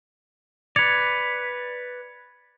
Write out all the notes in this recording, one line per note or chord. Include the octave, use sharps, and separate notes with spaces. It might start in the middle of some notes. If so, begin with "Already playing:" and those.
B4 D5 G#6 C#7 F7